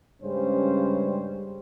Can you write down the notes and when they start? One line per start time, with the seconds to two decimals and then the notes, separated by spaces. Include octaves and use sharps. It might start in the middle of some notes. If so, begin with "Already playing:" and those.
0.23 G2 C#3 G3 G#3 C#4 C5